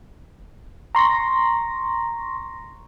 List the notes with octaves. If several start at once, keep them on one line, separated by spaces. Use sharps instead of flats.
A#5 C6 C#6 A#6